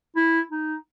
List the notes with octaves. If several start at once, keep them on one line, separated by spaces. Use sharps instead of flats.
E4
D#4